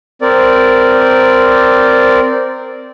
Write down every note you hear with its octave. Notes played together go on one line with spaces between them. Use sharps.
C4 A#4 D5